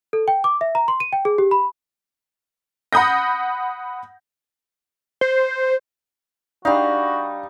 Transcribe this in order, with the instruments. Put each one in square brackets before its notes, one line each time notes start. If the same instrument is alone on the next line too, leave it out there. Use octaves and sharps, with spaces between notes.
[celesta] A4
G5
D6
E5
A#5
C6
D#7
G5
G#4
G4
B5
[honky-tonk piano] F#5 B5 D#6 G6 A#6
[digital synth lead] C5
[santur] G3 D#4 [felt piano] D4 [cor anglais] F#4 [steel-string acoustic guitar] F5